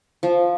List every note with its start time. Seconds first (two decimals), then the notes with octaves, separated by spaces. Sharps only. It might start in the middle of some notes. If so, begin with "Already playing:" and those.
0.23 F3